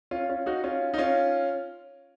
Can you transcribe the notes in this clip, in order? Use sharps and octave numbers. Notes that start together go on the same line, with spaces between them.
C#4 F4
C#4 F4
D#4 F#4
C#4 F4
D#4
C#4 F4